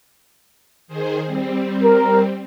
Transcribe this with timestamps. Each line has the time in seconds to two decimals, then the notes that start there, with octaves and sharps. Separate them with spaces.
0.88 D#3 G#4 C5
1.25 G3 C4
1.83 A#4